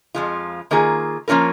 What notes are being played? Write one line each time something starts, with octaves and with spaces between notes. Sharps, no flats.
F2 F3 G#3 F4
D#3 A#3 F4 G#4
F3 A#3 C#4 F4 A#4